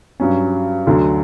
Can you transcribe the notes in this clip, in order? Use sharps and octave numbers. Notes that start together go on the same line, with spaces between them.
G2 F#3 C#4
D2 D3 F#3